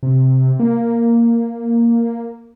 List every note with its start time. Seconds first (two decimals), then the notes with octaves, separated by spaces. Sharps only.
0.03 C3
0.60 A#3